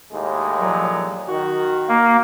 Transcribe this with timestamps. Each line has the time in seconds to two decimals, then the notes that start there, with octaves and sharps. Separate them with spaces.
0.12 D#2 A2 G#3
0.61 A#2 F3 F#3
1.28 D#3 F#4
1.88 A#3